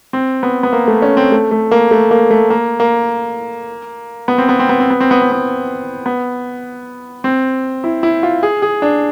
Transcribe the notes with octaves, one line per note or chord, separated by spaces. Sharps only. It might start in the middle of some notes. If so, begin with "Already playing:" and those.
C4
B3
B3
A#3
A3
C#4
C4
A3
A3
A#3
A3
A#3
A3
A#3
A#3
B3
C4
B3
C4
B3
C4
B3
C4
B3
C4
B3
B3
C4
E4
E4
F4
G#4
G#4
D4